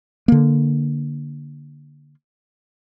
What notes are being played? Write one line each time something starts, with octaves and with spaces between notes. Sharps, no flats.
D3 A#3